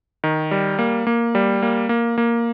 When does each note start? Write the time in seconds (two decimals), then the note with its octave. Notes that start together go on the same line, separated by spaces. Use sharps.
0.24 D#3
0.51 G3
0.79 A#3
1.07 A#3
1.35 G3
1.62 A#3
1.89 A#3
2.18 A#3